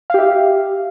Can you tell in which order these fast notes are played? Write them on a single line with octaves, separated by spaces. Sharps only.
F5 G4 E5